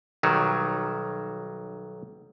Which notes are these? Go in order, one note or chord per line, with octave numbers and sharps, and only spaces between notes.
B1 D#3 F#3 G3